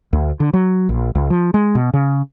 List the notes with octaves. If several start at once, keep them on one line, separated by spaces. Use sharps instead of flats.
D2
D3
F#3
A#1
C#2
F3
G#3
B2
C#3